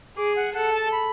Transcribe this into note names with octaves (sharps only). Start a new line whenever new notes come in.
G#4 D6
F#5
A4 F#5
A5
B5